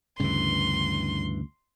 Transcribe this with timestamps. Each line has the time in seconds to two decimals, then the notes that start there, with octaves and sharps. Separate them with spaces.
0.20 D2 G2 C#3 E3 C6